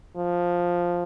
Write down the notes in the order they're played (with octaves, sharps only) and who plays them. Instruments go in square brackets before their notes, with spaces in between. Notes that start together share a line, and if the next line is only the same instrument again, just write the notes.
[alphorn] F3